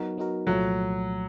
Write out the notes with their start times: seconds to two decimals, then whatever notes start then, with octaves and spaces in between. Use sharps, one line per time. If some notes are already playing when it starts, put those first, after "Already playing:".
Already playing: F#3 B3 D#4 F#4 A#4
0.17 F#3 B3 D#4 F#4 A#4
0.47 C2 A#2 F3 F#3 A3